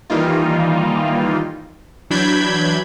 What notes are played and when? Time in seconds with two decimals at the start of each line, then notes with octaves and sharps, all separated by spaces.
0.10 D#3 E3 G3 A#3 D#4 F4
2.10 E3 F#3 D4 B5 G6 G#6